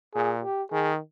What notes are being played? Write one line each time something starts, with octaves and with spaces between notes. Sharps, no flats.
A#2 G#4
G4
D#3 G#4